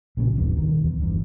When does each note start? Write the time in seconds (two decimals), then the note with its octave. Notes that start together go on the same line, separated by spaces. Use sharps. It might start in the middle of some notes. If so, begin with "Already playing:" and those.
0.17 A#1 A#2 C#3
0.36 D1 E2 G2
0.55 E1 C3 D#3
0.84 E2
1.01 G1 E2 G2